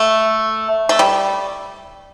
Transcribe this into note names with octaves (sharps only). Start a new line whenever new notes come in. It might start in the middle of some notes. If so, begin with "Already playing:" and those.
Already playing: A3
A3
G3